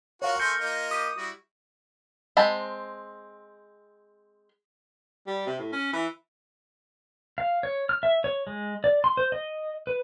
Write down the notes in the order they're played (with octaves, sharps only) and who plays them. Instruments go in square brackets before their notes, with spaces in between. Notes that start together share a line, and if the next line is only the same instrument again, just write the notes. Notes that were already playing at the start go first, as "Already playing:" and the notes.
[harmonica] F4 F#4 A#4 [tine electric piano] C#5 F5 [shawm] C#6
[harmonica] A3 G#5 C6 [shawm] A#4 [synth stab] G6 [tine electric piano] C#7
[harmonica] A#3 F4 D#5
[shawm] G4 [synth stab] D#6
[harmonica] G3 E4 [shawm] F#4
[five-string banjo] G#3 C4 A5 B5
[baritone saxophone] G3
C3
A2
C#4
E3
[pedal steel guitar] F5
C#5
F6
E5
C#5
G#3
D5
C6
C5
D#5
B4